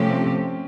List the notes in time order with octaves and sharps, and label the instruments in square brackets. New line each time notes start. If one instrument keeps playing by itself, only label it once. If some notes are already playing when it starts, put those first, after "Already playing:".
Already playing: [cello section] C3 F3 A3 G4 [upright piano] C#4
[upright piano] C4